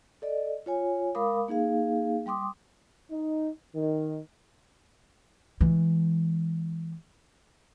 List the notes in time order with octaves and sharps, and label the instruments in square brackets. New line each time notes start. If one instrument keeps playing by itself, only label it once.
[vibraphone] A4 D5 D#5
F4 C#5 G#5
G#3 A#4 F5 B5 D6 D#6
A#3 D#4 G#4 F5
G3 G5 C6 D6 D#6
[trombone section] D#4
D#3
[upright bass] E3 G#3